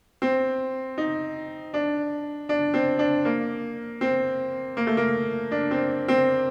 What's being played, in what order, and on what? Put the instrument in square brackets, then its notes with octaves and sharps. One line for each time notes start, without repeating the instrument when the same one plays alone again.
[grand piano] C4
D#4
D4
D4
C4
D4
A#3
C4
A#3
A3
A#3
D4
C4
C4